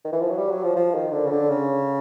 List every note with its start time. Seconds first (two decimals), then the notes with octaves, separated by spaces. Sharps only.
0.05 D#3
0.12 E3
0.21 F3
0.30 F#3
0.38 G3
0.51 F#3
0.64 F3
0.76 F3
0.94 D#3
1.12 D3
1.26 C#3
1.31 D3
1.50 C#3